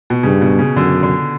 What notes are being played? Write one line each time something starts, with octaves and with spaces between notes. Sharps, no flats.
B2
G2 C#3
B2
C#3
F#2 D3
D3